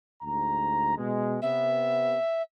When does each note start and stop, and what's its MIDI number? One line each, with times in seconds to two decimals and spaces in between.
0.22 0.95 38
0.22 0.95 44
0.22 0.95 82
0.96 1.37 47
0.96 1.37 56
1.42 2.17 48
1.42 2.17 59
1.42 2.42 76